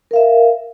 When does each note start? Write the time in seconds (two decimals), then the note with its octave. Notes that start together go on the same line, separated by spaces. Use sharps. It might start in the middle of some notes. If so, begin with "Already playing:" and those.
0.11 A#4
0.13 F5
0.16 E5